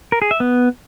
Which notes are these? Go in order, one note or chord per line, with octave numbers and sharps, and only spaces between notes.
A#4
G#4
E5
B3